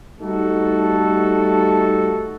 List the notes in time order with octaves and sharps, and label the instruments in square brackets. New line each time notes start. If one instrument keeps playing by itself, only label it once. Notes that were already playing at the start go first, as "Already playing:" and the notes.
[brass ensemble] G3 A3 D#4 F#4 A4